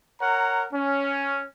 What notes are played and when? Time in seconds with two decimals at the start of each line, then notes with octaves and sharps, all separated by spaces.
0.21 A#4 C#5 F#5 A#5
0.73 C#4